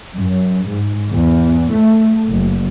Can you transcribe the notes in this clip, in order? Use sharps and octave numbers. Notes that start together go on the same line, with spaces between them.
F#2
G#2
E2
A3
F#1